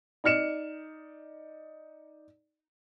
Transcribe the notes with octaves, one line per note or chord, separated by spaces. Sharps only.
D#4 D5 F6 C#7 E7